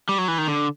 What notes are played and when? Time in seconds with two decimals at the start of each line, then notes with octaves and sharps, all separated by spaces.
0.09 G3
0.18 F#3
0.28 E3
0.38 D#3
0.48 D3